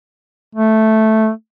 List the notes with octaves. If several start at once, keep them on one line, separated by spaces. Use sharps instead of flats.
A3